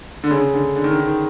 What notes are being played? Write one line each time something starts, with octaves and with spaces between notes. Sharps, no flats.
D3
C#3
D3
D3
D#3
D3
D#3